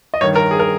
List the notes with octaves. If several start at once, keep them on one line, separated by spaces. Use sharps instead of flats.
D#5
G2 D#3 C#5
A#4
G#4
A#4